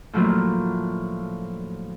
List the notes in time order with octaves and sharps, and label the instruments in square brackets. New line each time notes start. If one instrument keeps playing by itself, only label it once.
[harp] A2 D3 F3 F#3 A3 A#3